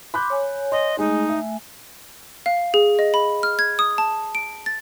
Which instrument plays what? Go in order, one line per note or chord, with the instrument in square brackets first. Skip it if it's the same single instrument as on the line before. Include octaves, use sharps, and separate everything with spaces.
[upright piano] B5 F#6 G6 [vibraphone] C6 D6
[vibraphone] C#5 G#5
[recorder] D#5 [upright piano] C6
[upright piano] G#3 [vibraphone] A3 G#5 [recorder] D#4
[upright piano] E5
[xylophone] F5
G#4
D#5
B5
F6
G#6
D#6
A5
D7
A6